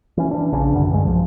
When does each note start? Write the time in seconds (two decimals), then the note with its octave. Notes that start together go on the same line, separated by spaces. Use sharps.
0.17 E3 C#4
0.31 E3 D4
0.53 A#1 C#3 D4
0.74 C2 F#2 D3
0.91 G2 D3 G#3
1.05 B1 F3